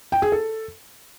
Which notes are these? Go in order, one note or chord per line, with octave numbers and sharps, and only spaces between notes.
G5
G#4
A4